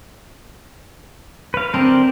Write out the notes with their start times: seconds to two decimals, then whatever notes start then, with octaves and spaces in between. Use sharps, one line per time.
1.54 B4 F5
1.74 D3 C4 A#4 C5 D5 A5